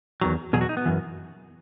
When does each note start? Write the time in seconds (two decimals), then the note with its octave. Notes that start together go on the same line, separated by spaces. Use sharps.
0.21 E2 D#3 F#3
0.53 E2 B2 F#3 G#4
0.61 F#4
0.69 D#4
0.77 B3
0.85 F#2 E3